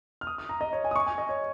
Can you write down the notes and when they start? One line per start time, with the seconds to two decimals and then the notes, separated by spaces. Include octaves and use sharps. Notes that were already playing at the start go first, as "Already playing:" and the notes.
0.21 F6
0.27 D#6
0.38 D#6
0.49 A#5
0.61 D#5
0.73 C#5
0.84 G#5
0.91 D#6
0.96 C#6
1.06 G#5
1.18 D#5
1.29 C#5